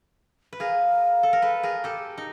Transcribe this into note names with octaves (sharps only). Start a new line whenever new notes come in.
B4
G#4 A#4 F5
A4
A#4
A4 B4
G#4 A#4
G4 A4
D#4